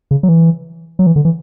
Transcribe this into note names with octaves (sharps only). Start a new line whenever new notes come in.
C#3
F#3
E3
F#3
E3
D3
E3